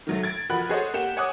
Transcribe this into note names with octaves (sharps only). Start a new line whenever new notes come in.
D#3 F#3 A3
G#6 A6 D7
F3 F#4 A#4 B4 B5 F#6
F#4 G#4 A4 C5 C#5 D#5
A#3 G4 F#5 E7
C#5 F#5 G#5 D6 D#6 F#6